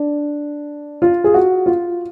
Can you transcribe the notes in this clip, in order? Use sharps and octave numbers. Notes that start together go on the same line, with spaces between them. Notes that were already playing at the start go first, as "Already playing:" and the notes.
Already playing: D4
F4
G#4
F#4
F4